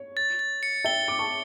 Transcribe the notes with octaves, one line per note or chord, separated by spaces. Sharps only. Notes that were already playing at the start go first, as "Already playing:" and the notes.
Already playing: C#5
A6
A6
C#7
E5 G5 G7
D6 A6
A5 C#6